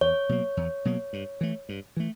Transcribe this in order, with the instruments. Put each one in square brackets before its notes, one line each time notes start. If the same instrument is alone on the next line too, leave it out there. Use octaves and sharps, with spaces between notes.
[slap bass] E2 [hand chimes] C#5
[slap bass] B2 F#3 A#3
E2
B2 F#3 A#3
G2
E3 A3
G2
E3 A3